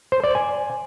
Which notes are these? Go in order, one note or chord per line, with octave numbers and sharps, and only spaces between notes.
C5
D5
G#5